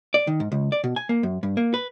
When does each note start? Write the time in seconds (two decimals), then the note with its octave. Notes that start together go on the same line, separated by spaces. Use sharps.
0.14 D5
0.27 D#3
0.40 G#2
0.52 C#2
0.72 D5
0.84 B2
0.96 G#5
1.09 A#3
1.23 F#2
1.43 G2
1.57 A#3
1.74 B4